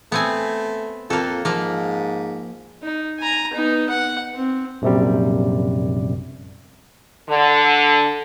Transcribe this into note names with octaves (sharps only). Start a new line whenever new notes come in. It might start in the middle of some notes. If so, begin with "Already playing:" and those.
A3 B3 C4 G#5
F2 A#3 A4
G#2 F3 A#3
D#4
G#5 A#5
B3 D#4
F#5
C4
A#1 F#2 C3 G3
D3